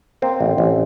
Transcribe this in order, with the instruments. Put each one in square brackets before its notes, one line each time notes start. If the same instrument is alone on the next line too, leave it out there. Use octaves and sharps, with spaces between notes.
[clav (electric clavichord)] A#3 C4
A1
A1